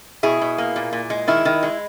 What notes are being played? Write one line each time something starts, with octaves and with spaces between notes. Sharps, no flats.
B2 E4 G#4
B2
A#3
A#2
A#2
G#3
D#3 E4
D#3
G#3